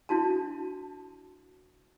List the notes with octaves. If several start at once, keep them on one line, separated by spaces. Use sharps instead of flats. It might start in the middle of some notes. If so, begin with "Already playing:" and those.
D4 E4 F#4 A5